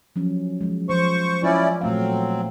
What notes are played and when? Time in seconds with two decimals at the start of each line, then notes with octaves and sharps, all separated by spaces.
0.16 F3 F#3 C#4
0.61 F3 G#3
0.89 F3 C5 C#6
1.44 C#4 E4 F4 D5
1.81 A#2 F#3 A3 C4 F5